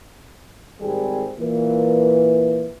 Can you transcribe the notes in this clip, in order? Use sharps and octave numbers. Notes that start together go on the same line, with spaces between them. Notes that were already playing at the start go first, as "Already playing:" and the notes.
G#1 G3 C4 G#4
A#2 E3